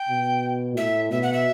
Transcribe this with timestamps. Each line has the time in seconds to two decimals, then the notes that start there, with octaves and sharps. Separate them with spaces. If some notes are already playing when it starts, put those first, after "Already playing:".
Already playing: G5
0.09 B2
0.76 A2 E5
1.11 B2 E5
1.23 F#5
1.33 E5